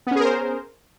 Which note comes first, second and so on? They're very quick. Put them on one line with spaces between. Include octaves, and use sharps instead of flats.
B3 C#4 G#4 A#4 C5